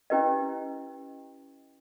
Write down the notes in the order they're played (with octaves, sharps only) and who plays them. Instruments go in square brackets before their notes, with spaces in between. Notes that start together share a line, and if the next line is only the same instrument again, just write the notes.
[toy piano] C#4 E4 G4 B4 D#5